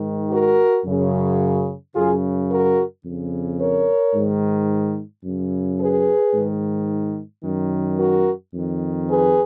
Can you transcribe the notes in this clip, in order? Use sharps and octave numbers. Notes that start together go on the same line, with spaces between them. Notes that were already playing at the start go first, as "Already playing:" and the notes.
Already playing: G#2 D#3
F#4 A#4
F#2 C#3
F#2 C#3 F4 G#4
F#4 A#4
F2 C#3
A#4 C#5
G#2 D#3
F#2 C#3
G#4 B4
G#2 D#3
F#2 D#3
F#4 A#4
F2 D#3
G#4 B4